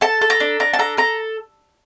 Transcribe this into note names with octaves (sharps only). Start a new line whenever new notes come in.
A4 A5
A4
A#5
D4
D4 A#5
A5
A4 A#5
A4 A#5